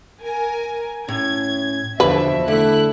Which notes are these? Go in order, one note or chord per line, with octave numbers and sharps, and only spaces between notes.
A#4 G#5
A2 C#4 G#6
E2 B2 D3 F3 B4 E5
D3 A3 E4 F#6